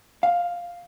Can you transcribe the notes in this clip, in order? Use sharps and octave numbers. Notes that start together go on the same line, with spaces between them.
F5